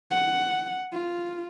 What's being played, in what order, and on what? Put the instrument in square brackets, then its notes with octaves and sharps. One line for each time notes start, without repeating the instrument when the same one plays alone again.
[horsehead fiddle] F#5
F4